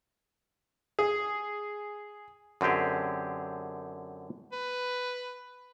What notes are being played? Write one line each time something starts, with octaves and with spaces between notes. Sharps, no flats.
G#4
F#2 D3 C4 G4 G#4
B4